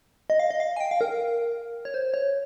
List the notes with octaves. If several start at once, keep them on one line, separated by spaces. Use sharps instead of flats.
D#5
F5
D#5
F5
G#5
G5
F5
A#4
C#5
C5
C#5